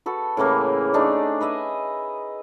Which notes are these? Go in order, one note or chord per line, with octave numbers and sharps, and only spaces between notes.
F#4 A4 B4
A2 C#3 E3 A#3
A3 D4 D#4 G#4
B4 D#5 E5 G#5